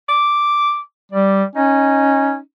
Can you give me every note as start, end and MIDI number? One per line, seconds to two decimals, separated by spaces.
0.09 0.78 86
1.12 1.44 55
1.12 1.48 74
1.56 2.37 61
1.56 2.39 63